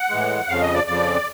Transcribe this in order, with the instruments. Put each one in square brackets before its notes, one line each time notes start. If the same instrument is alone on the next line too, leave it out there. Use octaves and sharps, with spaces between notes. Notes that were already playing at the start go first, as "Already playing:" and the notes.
Already playing: [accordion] F#5
A2 E3 G#3
F2 C#3 F3 F5
D#5
D5
F2 C#3 F3 D5